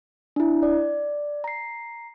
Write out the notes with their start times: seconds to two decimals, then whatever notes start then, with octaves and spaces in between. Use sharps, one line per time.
0.36 D4 E4
0.63 D5
1.44 A#5 C7